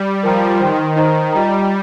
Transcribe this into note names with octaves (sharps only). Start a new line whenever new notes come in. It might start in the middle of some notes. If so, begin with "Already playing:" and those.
Already playing: G3
F3 A#4 G5 A#5
D#3 C5 G5 C6
D#3 D#4 C5 D#5 A#5
G3 F4 D#5 G5 A#5